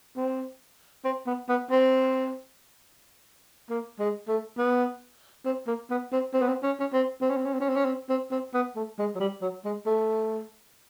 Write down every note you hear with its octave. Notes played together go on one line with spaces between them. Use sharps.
C4
C4
B3
B3
C4
A#3
G#3
A3
B3
C4
A#3
B3
C4
C4
B3
C4
C#4
C#4
C4
C4
C#4
C4
C#4
C4
C#4
C4
C#4
C4
C4
C4
B3
A3
G#3
F#3
G3
F#3
G#3
A3